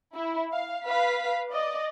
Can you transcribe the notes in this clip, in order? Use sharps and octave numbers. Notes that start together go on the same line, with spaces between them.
E4
F5
B4 F5 B6
D5 D#5